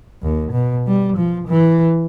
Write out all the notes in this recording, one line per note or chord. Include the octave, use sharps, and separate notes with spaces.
D#2
B2
G3
F3
E3